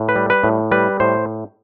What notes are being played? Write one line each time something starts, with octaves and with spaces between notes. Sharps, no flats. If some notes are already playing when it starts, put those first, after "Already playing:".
Already playing: A2
B4
G3
B4
A2
G3 B4
A2 C5